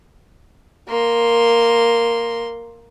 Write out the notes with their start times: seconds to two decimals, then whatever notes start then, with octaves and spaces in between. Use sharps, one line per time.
0.88 A#3 C6